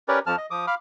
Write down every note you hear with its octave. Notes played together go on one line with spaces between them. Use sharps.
C#4 G4 A#4 B4 C#5 D5
F2 F3 A5 F6
D#5
F3 D6 D#6
F5 B5 D6 F6